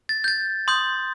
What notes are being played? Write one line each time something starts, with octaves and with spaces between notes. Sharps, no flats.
A6
G6
A6
C6 D#6 G6